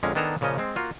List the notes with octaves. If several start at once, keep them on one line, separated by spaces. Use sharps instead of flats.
F2 D3 G#3 C#4 A#4
D#3 B3 D4 A4 G#5 A#5
A#2 C#3 F3 C#4 D#5
G#3 C4
A#3 F4 F#4